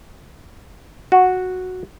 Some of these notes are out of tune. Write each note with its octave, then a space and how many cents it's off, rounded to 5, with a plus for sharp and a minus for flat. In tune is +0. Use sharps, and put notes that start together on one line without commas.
F#4 -5